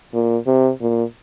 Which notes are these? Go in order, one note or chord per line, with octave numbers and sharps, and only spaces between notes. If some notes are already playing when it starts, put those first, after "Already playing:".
A#2
C3
A#2